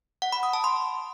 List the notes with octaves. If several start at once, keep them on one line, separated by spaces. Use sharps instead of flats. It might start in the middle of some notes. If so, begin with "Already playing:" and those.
F#5
B5
D#6
A5
C6